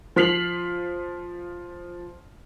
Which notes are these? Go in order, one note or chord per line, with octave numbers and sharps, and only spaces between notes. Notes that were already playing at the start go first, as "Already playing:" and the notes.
F3 F6 B6 C7 F7 F#7